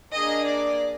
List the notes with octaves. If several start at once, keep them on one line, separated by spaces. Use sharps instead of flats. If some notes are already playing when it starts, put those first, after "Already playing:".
A#3 D4 G#4 D#5
D5